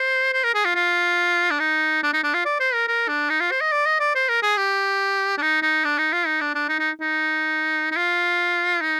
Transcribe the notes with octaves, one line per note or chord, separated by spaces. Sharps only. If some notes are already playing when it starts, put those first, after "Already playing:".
Already playing: C5
C5
A#4
G#4
F4
F4
D4
D#4
D4
D#4
D4
F4
D5
C5
A#4
A#4
D4
D#4
F4
C5
D#5
D5
D#5
D5
C5
A#4
G#4
G4
D4
D#4
D#4
D4
D#4
F4
D#4
D4
D4
D#4
D#4
D#4
D#4
F4
D#4